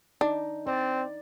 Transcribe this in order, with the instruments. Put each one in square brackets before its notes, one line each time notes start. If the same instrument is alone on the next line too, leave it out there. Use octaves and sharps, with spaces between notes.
[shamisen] D4 [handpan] D#4
[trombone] C4 [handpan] D5